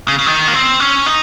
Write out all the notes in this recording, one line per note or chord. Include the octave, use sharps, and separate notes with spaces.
C#3
C#3
D#3
A#3
C4
C#4
D#4